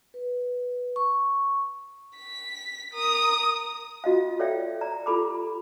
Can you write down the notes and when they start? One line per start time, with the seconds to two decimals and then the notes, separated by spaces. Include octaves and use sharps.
0.14 B4
0.96 C#6
2.16 B6
2.94 A#4 D#6
4.04 F4 F#4 D#5 F5
4.39 A4 C#5 D5 E5 F5 G5
4.81 D5 A#5
5.06 F4 G4 A4 B5 D6